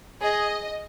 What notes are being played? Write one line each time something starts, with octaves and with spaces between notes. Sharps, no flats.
G#4 D#5